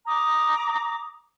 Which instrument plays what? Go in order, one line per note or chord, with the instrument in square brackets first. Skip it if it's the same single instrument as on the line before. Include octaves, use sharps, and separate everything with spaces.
[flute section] A#5 D6 D#6